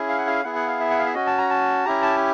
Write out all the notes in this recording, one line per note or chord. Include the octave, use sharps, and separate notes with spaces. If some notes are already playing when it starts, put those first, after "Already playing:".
Already playing: C#4 E4 G#4
F5
F#5
F5
B3 E4 G#4 F#5
F#5
F5
E5
F#5
F5
E5
C#4 F#4 D#5
A5
A#5
A5
C#4 E4 G4 A#5
A5